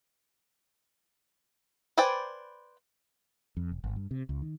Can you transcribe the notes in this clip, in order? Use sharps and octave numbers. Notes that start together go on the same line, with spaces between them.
B4 C5 D5 G5 G#5
F2
E1
G#1
G2
C3
C#2
D#3